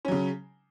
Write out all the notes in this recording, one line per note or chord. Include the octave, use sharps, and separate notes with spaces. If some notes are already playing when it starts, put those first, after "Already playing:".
C#3 F#3 C#4